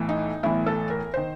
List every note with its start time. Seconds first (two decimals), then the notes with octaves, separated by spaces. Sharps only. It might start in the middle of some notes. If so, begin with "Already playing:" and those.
Already playing: B1 A2 E3
0.09 D#4
0.43 B1 A2 E3 E4
0.66 A4
0.90 A#4
1.14 D#3 C5